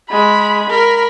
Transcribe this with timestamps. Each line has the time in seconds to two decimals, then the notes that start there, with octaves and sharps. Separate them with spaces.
0.10 G#3 B5
0.70 A#4 B5